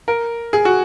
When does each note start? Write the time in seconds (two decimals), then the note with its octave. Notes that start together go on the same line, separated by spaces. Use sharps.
0.08 A#4
0.53 G#4
0.65 F#4